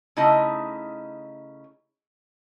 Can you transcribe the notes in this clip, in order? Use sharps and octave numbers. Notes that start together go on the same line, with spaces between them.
C#3 A3 D#4 E4 D#5